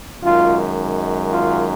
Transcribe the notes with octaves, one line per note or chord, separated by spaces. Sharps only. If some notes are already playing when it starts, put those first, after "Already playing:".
F#2 D#3 G#3 F4
F4